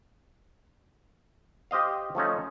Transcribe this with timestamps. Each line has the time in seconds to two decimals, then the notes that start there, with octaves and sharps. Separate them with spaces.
1.71 G4 C5 D#5 F5
2.15 F3 A3 C#4 D#4